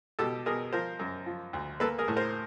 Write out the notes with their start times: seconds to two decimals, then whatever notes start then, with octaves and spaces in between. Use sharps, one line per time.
0.19 B2 G4 A4
0.46 B2 G#4 A#4
0.73 F3 A#4 C5
0.99 F#2
1.26 F3
1.53 D2
1.80 A#3 A4 B4
1.98 G#4 A#4
2.08 A2
2.16 A#4 C5